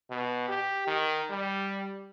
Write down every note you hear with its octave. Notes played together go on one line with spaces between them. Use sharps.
B2
G4
D#3
G3